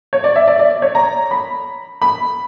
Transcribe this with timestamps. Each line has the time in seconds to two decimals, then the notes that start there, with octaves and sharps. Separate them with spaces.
0.13 C#5
0.24 D5
0.36 E5
0.47 D5
0.59 D5
0.82 C#5
0.95 A#5
1.31 B5
2.02 B5